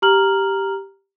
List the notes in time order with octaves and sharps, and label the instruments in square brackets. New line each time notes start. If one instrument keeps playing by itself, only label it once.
[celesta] G4 A#5 F6 F#7